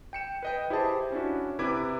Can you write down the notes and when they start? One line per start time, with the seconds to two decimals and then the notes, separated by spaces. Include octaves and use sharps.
0.13 G5 C#7 E7
0.43 B4 D#5 G5
0.70 E4 G4 G#4 C5 D#5 A5
1.12 C#4 D4 E4 F#4
1.59 C3 E4 B4 D6 G#6